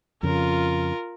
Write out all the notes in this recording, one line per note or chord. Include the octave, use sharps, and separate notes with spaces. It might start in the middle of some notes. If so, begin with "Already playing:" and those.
F2 C#3 F4 A#4